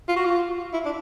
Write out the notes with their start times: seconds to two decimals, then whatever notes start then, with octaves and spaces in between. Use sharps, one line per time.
0.08 F4
0.16 F#4
0.25 F4
0.73 E4
0.85 D4